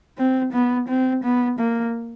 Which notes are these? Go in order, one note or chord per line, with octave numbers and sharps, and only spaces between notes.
C4
B3
C4
B3
A#3